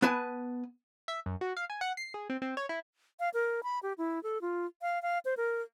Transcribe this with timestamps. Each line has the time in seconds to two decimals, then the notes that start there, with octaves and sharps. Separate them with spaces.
0.02 B3 B4 G#5 A5
1.08 E5
1.26 F#2
1.41 F#4
1.57 F5
1.70 G#5
1.81 F#5
1.97 C7
2.14 G#4
2.30 C4
2.42 C4
2.57 C#5
2.69 E4
3.20 F5
3.34 A#4
3.63 B5
3.83 G4
3.98 E4
4.23 A4
4.41 F4
4.82 F5
5.02 F5
5.25 C5
5.37 A#4